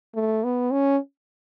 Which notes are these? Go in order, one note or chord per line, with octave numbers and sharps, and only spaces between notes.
A3
B3
C#4